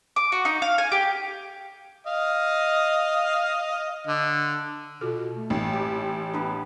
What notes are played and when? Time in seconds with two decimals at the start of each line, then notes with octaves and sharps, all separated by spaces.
0.16 D6
0.32 F#4
0.45 D#4
0.62 F5
0.78 G#5
0.92 G4
2.06 D#5 F5
4.07 D3
5.01 B2 F4 F#4 A4
5.35 A3
5.50 A1 D#4
5.73 G4
6.34 B3 D4 B4